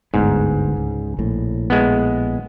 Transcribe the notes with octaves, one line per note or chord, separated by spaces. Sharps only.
G1 D2 G#2 B3
C#2
A#1 A2
G#3 B3